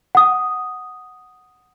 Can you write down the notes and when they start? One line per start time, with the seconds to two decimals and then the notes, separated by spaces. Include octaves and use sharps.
0.15 F#5 D#6